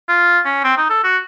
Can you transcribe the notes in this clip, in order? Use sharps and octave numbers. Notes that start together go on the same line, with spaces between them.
F4
C#4
C4
D#4
A4
F#4